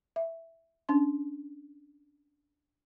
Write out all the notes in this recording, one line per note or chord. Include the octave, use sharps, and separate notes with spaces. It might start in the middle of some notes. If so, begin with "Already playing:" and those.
E5
C#4 D4 C6